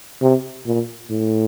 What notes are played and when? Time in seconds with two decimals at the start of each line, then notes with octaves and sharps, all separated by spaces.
0.21 C3
0.66 A#2
1.11 A2